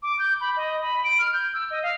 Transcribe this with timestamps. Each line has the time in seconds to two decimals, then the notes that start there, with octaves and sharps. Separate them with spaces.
0.03 D6
0.19 G6
0.41 B5
0.57 D#5
0.82 B5
1.04 D7
1.19 F6
1.33 G6
1.54 E6
1.71 D#5
1.83 F5